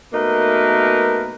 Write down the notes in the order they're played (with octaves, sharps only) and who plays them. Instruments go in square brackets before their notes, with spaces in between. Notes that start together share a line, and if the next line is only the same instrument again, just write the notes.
[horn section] B2 A3 A#3 D#4 A#4 B4